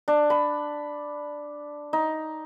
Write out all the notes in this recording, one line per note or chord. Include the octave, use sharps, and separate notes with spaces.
D4
B5
D#4